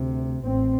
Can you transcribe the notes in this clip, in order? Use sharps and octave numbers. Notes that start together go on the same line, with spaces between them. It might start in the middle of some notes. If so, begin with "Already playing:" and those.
Already playing: D2 C3
A1 A2 C4